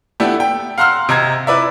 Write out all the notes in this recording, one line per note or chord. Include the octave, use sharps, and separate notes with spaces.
A3 B3 D4 E4 G4
G5
F5 F#5 A#5 C6 E6 F6
C3 D#5 A#5 G#6
E4 B4 D5 E5